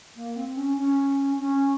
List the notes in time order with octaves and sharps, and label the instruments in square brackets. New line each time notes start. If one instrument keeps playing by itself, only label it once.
[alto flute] A#3
C4
C#4
C#4
C#4